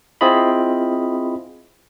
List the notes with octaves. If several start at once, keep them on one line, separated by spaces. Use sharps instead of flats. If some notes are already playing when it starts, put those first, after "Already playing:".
C4 E4 F4 G#4 D#5 B5